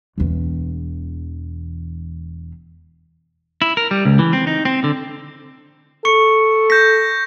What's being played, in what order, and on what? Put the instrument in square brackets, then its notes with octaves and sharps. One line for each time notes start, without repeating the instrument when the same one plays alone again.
[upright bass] E1 E2
[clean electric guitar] E4
A#4
G3
C#2
E3
C4
D#4
C4
D3
[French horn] A4 [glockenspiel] C#6 C#7
[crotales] G6 A#6 [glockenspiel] B6